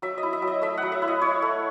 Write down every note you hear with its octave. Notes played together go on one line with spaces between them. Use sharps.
F#3 E5
D#5
E4
E5
F#3
D#5
A3 E5
F#3 F#5
E5
E4
D#5
E4 C#5
A3